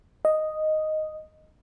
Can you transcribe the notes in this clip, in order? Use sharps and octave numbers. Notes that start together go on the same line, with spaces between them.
D#5